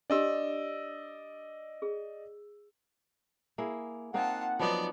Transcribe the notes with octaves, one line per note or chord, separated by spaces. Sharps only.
D4 G4 D5 D#5 E6
G#4
A#3 E4 G#4
A#3 C4 D#4 F4 F#5 A5
F3 F#3 B3 D#4 D5